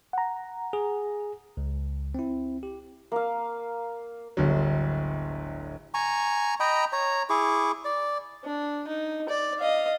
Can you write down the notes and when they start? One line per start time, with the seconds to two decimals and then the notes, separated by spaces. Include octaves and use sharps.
0.13 F#5 A#5
0.73 G#4
1.57 C#2
2.15 C4 E4
2.63 G4
3.12 A#3 F5
4.37 D1 G1 F#3
5.94 G#5 A#5 C#6
6.60 D#5 G5 A#5 B5
6.93 C#5 A#5
7.30 E4 G#4 C#6 D6
7.85 D5
8.44 D4
8.87 D#4
9.29 D5
9.59 D#5 F5